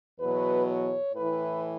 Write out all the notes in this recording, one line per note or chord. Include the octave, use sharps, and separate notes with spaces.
E2 B2 F#3 B4
C#5
A2 E3 B4